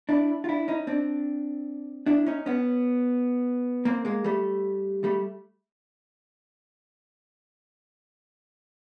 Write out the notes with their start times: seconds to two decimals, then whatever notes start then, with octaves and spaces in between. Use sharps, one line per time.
0.09 D4 E4
0.44 F4
0.49 D4 E4
0.68 C#4 D#4
0.87 C4 D4
2.06 D4 E4
2.27 C#4 D#4
2.46 B3 C#4
3.85 A#3 C4
4.05 G#3 A#3
4.24 G3 A3
5.04 G3 A3